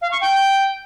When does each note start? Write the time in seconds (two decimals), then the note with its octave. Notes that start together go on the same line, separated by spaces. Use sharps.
0.01 F5
0.11 C#6
0.21 G5